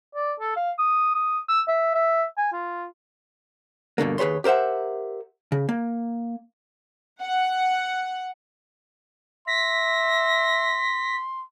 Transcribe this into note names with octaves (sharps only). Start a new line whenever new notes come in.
D5
A4
F5
D#6
D#6
E6
E5
E5
G#5
F4
G2 B2 D3 A#3
D#2 G#4 B4 C#5 C6
G4 A#4 C5 E5 F#5
C#3
A#3
F#5
E5 C6 A#6 B6